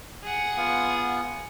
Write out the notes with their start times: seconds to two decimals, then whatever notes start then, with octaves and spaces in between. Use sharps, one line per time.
0.23 G#4 F#5
0.57 B3 F4